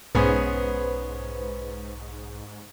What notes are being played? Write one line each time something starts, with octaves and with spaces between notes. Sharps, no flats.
B1 G#2 B3 C#4 G#4 B4 C5